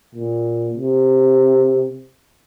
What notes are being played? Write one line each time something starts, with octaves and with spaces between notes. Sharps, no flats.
A#2
C3